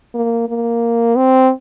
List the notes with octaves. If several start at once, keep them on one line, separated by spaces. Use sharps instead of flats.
A#3
A#3
C4